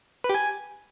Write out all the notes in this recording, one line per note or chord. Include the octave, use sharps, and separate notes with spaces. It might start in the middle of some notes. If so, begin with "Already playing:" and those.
B4
G4
G#5